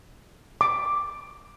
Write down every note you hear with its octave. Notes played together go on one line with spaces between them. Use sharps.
D6